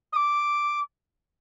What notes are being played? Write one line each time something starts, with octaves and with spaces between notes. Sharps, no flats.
D#6
D6